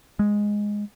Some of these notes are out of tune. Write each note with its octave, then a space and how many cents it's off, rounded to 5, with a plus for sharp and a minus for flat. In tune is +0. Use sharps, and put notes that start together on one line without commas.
G#3 -5